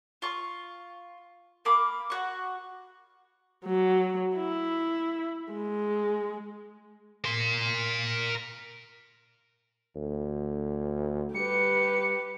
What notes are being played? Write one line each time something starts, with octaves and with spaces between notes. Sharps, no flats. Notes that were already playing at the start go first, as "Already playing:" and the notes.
F4 C#6
A#3 B5 D6
F#4 C#6
F#3
E4
G#3
A#4 C6
D2
G3 G4 B4 C#7